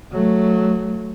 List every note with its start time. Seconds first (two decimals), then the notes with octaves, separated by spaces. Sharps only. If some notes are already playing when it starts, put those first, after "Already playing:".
0.12 F#3 A3